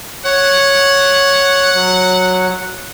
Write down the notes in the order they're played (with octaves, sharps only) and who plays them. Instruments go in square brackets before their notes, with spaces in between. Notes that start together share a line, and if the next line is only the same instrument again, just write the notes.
[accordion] C#5 [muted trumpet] F#5
[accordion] F#3